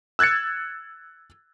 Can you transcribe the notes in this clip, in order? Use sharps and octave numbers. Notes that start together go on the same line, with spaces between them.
E6 F#6 G#6 A6 C#7